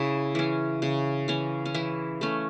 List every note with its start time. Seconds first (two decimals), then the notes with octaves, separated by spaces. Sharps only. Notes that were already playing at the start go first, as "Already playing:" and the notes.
Already playing: C#3 E4
0.35 E3 C#4
0.82 C#3
1.28 E3 C#4
1.65 C#4
1.74 E3 E4
2.21 A3 C#4